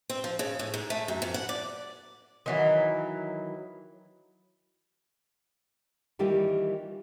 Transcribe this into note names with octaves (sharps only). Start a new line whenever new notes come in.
C4
F3
C#3
A2
G#2
A3
F#2
F2
F#5
D5
D#3 E3 F#3
D#3 E3 G3 A#3 F4 G4